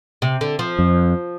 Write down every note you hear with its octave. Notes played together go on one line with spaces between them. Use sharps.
C3
D3
F3
F2